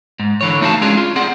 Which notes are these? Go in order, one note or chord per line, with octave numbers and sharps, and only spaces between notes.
G#2
D3 E3 C#5
A3 D#4 F#4 F5 A5
G#3 C#4 D4 F4 F#4 G#4
F4
C4 G#4 D5 F#5